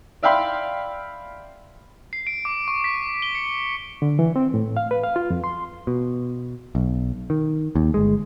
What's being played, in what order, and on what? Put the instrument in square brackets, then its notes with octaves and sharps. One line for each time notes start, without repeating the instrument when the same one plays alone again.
[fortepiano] D5 E5 F5 G5 B5 C6
[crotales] C7
D7
D6
C#6
B6
G7
C#7
[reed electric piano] D3
E3
C4
A2
F5
B4
F5
F4
F2
C6
[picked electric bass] B2
B1
D#3
D#2
G1 G#3